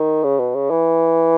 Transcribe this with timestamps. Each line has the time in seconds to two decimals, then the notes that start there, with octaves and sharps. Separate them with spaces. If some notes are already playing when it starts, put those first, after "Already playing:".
Already playing: D#3
0.24 C#3
0.40 B2
0.55 C#3
0.70 E3